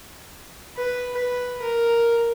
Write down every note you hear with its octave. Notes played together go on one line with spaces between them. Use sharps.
B4
B4
A#4